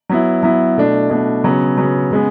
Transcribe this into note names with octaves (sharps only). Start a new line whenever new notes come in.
F#3 B3 E4
F#3 B3 E4
B2 A3 D4
B2 A3 D4
C#3 F#3 B3
C#3 F#3 B3
C#3 G#3 B3